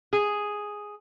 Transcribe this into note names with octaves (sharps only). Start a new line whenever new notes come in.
G#4